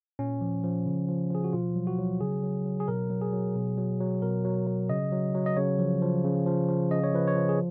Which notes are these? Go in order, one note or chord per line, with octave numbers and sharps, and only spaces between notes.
A#2 C#4
F3
F3
C#3
F3
F3 G#4
F#4
B2 F4
F#3
F#4
F#3
C#3 G#4
F#3
F#3
G#4
B2 A#4
F#3
G#4
F#3
B2
F#3
F#3
B2 A#4
F#3
F#3
C#3 D#5
F#3
F#3
D#5
C#3 C#5
F3
F3
C#3
F3
F3
C#3 D#5
C#5
F3 B4
C#5
F3
G#4